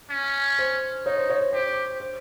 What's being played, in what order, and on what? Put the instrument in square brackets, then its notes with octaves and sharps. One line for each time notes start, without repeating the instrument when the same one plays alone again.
[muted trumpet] C#4
[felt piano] C5
[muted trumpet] D#4 [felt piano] C#5
[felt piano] C5
C#5
C5
[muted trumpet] G4 [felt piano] C5
[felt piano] C5